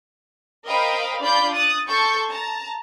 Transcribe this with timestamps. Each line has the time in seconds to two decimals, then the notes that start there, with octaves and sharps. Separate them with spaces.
0.66 A#4 C5 D#5 F5 G5 B5
1.22 D4 F4 D5 B5 G6
1.54 D#6 F#6 A6
1.88 A4 A5 C6 C#6 G6
2.30 A5 A#5